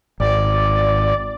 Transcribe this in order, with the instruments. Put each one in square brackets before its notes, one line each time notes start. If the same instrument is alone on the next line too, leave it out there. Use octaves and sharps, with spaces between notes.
[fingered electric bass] G#1 [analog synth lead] D5